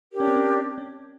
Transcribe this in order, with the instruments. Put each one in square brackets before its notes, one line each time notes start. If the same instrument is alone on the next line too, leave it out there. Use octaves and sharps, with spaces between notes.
[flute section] D4 G4 A#4 C#5
[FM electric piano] C#4
C4
C#4
C#4